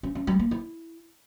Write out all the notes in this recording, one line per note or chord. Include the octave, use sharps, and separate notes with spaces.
C#4
C#4
G3
A#3
E4